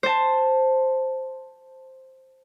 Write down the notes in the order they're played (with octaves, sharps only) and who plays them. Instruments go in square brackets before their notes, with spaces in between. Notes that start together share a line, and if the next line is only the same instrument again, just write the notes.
[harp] C5 A5